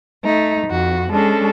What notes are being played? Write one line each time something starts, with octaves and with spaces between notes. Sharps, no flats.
A3 D#4
F2 F#4
G#3 C#4 D4 A4